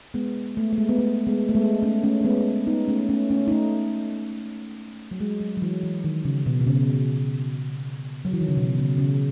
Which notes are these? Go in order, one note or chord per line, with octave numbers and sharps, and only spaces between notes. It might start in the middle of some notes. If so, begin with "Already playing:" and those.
G#3 B3
A3
A3
G#3
B3
A3
G#3 B3
A3
G#3 B3
A3 C#4
A3 C#4
C#4
G#3 B3
B3 D#4
A3 C#4
A3 C#4
A3 C#4
D#4
A3 C#4
F#3
G#3
F#3
F#3
E3
E3
D#3
C#3
B2
B2
C#3
F#3
E3
D#3
C#3
B2
C#3
C#3